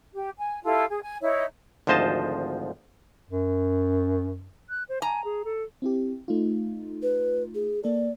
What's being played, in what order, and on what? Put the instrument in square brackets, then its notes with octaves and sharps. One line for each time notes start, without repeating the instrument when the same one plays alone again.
[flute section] G4
G#5
E4 F4 G4 A4
G#4
G#5
D#4 E4 C#5 E5
[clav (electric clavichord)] G#1 D2 F3 C5 D#5 A5
[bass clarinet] F#2
[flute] F#6
C5
[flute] G#5 [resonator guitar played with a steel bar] A#5
[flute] G#4
A4
[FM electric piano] C4 E4 G4
A3 D#4 F4
[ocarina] B4
G#4
[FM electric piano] A#3 A4 [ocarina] D5